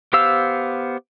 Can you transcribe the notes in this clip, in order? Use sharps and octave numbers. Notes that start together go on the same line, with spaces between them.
B3 G4 C5 F5 E6